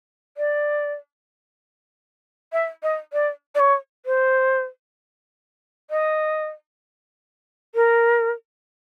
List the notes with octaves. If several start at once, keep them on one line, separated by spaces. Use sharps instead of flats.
D5
E5
D#5
D5
D5
C#5
C5
D#5
A#4